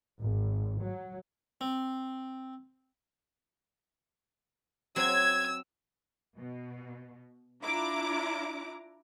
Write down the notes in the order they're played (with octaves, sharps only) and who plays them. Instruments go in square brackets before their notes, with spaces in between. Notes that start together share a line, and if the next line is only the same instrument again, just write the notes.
[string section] G#1
F#3
[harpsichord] C4
[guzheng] F#3 C4 [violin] E6 [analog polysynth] G#6
[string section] B2
D4 E4 F4 A#5 D6